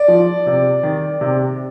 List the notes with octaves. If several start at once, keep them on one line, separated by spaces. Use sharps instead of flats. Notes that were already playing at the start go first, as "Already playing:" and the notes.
Already playing: D5
F3
C3
D#3
C3